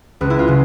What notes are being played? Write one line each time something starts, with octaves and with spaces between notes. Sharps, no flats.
C#2 B4
E4
F4
C#3 F#3